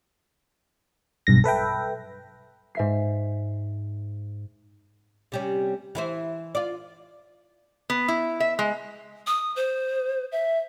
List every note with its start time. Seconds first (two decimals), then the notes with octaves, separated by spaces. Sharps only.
1.27 B1 G2 A#6
1.44 A4 B4 E5 G5
2.75 G#2 E5 C7
5.32 C3 G3 C#4
5.95 E3 E4 C5
6.55 F4 D5
7.90 B3
8.08 E4
8.40 E5
8.59 G#3
9.27 D#6
9.56 C5
10.32 E5